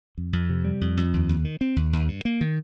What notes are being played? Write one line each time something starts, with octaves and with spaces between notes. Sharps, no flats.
F2
F2
C3
G3
F2
F2
D#2
D#2
D#3
C4
D#2
D#2
G2
A#3
D#3